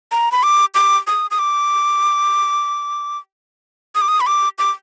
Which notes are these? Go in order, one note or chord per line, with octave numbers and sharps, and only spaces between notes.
A#5
B5
D6
D6
D#6
D#6
D6
D#6
D6
D#6
B5
D6
D6